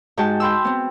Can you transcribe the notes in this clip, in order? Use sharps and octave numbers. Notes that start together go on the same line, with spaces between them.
G#2 F#4 G5 A5
G5 B5 C6 E6
B3 C4